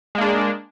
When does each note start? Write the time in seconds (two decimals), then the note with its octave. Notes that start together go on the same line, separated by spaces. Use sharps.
0.15 G#3
0.18 A#3
0.21 D4